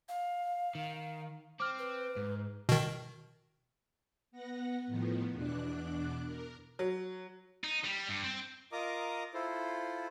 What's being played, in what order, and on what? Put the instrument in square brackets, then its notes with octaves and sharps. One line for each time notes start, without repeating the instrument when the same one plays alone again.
[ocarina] F5
[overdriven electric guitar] D#3
[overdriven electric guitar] C4 [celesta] D6 F6
[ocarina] B4
[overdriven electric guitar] G#2
[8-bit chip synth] B2 D#3
[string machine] B3 F#5 A#6
A2 D#3 F3 B3
E2 B2 D4 D6 F#6
A#4
[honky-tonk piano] F#3
[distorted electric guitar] D#4
G3
G2
C4
[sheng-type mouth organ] F4 A#4 D#5 A#5 D6 D#6
E4 F4 A4 C5